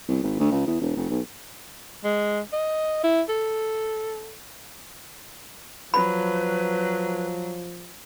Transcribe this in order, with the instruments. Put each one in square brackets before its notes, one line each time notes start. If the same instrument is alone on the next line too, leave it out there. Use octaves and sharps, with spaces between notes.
[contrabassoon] C2
G#1
D2
C#2
E2
E1
F1
B1
[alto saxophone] G#3
D#5
E4
A4
[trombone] F3 [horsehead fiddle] F#3 [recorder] B4 [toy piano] B5